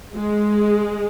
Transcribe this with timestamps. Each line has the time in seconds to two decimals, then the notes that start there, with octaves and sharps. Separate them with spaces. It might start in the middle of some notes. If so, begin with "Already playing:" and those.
0.15 G#3